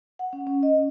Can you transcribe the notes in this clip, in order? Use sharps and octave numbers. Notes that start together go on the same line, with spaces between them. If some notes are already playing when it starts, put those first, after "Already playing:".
F#5
C#4
C#4
D#5